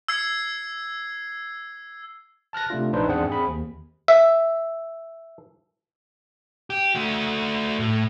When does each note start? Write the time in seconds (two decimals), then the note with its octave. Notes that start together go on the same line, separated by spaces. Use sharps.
0.08 E6 G#6 C7
2.53 A5 F6 F#6 A#6
2.70 C3 A3 D4 F4
2.93 A#1 D4 D#4 B4 C5
3.07 E2 G#2 C4 D4 G#4 F#5
3.28 C4 G#4 B5
3.48 D#2
4.08 E5
6.70 G4
6.95 A3 F#4
7.79 A2